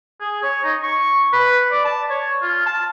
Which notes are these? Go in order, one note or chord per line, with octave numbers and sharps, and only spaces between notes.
G#4
C#5
D#4
C#6
B4
D5
A5
C#5
F4
A5